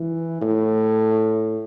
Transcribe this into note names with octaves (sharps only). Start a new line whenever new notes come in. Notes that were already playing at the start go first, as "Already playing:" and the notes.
Already playing: E3
A2